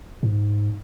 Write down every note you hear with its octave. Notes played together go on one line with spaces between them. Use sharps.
G#2